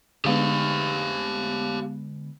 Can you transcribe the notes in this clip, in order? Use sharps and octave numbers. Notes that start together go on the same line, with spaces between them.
D3 G#3 B3 G4 F5